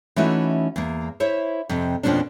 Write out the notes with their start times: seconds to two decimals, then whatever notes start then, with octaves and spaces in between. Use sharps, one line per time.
0.16 E3 A3 C#4 D#4 E4 F#4
0.76 E2 A#3
1.20 E4 C5 C#5 E5
1.69 F2 C3
2.03 F2 B2 F3 A#3 C#4 D4